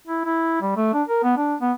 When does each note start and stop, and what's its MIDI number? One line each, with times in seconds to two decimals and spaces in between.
0.07 0.22 64
0.25 0.58 64
0.62 0.75 55
0.76 0.91 57
0.93 1.02 62
1.08 1.21 70
1.23 1.34 59
1.37 1.55 62
1.61 1.72 59